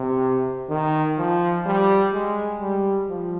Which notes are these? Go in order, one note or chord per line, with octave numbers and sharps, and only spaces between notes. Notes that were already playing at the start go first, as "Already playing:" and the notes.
Already playing: C3
D#3
F3
G3
G#3
G3
F3